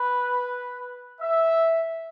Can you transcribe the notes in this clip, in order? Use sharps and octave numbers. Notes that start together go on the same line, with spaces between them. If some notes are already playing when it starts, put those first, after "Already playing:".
Already playing: B4
E5